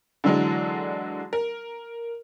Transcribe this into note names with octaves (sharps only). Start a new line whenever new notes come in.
D3 E3 F#3 G#3 D4
A#4